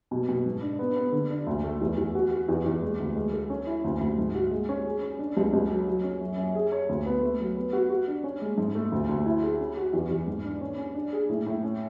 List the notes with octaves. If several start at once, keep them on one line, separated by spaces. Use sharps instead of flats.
B2
B2
G#2
D4
B3
B3
D3
D4
D2
A3
E2
E2
F#4
F#4
E2
E2
G#3
D2
G#3
A4
C#4
E4
D2
D2
G#2
F#4
G#3
C#4
G#4
C#4
D4
C#2
C#2
F#3
F#3
C#4
F#2
F#2
G#4
C#5
D2
B3
A3
F#3
B3
F#4
F#4
D4
C#4
G#3
G#2
A3
D2
D2
E4
G#4
C#4
F#4
E2
E2
G#2
D4
C#4
C#4
D4
G#4
A2
A2
C#4